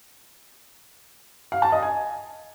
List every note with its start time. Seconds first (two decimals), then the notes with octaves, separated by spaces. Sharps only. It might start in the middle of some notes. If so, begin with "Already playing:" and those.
1.52 F5
1.62 A5
1.72 D#5
1.82 G#5